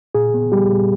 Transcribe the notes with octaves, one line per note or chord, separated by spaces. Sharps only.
A#2 G#4
B3
G3 G4
A#2